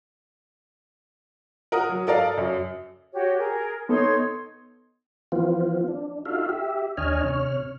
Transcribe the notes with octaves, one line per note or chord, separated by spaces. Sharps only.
A#4 F#5 D#6
F#3
A4 A#4 D5 F5
F#2
F#4 G4 C#5
G#4 A#4
B3 D#4 A4 C#5 C6
E3 F3 B3 C4 F4
D4
D#4 F4 F#4 A4 E5 F5
G4 E5
D#2 D4 C#5 D#5 G#5 F6
C3 C#5 F6